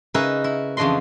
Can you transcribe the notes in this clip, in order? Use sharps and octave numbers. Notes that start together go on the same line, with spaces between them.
C#3 D#4 A#4 B4 E5 G#5
E4
F2 C#3 E3 D4 D#5 C6